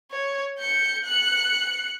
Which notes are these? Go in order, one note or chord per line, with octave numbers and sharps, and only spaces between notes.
C#5
G6 C#7
F#6 C#7